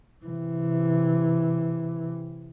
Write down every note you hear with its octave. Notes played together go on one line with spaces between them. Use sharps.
C3 E3